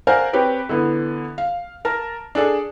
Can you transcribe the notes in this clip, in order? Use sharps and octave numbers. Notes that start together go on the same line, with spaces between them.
A#4 C5 D5 F5 F#5 G#5
C4 G4 B4 C#5
D3 E3 B3
F5
A#4 A5
D4 G#4 A4 D5